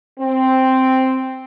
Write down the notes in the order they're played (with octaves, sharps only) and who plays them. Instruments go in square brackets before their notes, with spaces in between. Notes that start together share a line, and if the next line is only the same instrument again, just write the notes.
[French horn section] C4